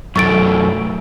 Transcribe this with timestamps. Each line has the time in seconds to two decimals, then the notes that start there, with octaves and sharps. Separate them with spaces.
0.16 F#2 A3 C#6 A6 D7